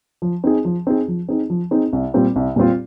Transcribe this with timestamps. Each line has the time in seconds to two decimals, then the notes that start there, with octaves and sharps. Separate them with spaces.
0.22 F3
0.44 C4 D#4 G#4
0.65 F3
0.87 C4 D#4 G#4
1.08 F3
1.29 C4 D#4 G#4
1.50 F3
1.71 C4 D#4 G#4
1.93 C2
2.14 A#2 G3 C4 F4
2.36 C2
2.56 A#2 G3 C4 F4